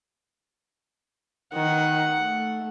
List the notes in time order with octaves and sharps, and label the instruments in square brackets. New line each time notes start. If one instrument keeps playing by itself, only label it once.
[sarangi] D#3 [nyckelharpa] F#5
[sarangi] A3